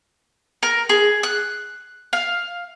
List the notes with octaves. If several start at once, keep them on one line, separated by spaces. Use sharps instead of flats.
A#4
G#4
F#6
F5